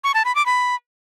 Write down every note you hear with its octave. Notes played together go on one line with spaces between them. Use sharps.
C#6
A5
B5
D6
B5